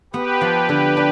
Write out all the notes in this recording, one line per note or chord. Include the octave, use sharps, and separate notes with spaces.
B3 G4 B4
F3
D3
D4